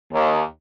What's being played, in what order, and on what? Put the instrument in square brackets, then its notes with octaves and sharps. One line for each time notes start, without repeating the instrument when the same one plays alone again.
[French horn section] D#2